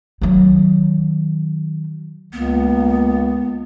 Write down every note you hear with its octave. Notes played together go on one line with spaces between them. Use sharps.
D#3 F#3
C#2 A#3 B3